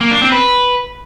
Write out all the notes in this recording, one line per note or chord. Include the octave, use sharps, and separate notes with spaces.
A#3
D4
C4
B4